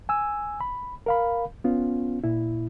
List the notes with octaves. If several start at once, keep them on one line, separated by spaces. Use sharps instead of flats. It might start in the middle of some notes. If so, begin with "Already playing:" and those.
G#5 E6
B5
A#4 F5 B5
B3 C#4 F4
A#2 E4